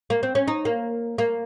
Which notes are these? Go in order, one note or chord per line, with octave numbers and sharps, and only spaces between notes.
A#3
C4
C#4
D#4
A#3
A#3